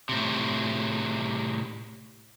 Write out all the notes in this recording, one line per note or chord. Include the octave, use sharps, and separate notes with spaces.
A2 C3